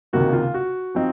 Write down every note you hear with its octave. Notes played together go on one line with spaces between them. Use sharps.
C#2 C3 D#3 A#3 F#4
F4
F#4
F3 C4 D#4